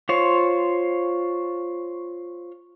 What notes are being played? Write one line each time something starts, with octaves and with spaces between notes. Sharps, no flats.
F4 C5 C#5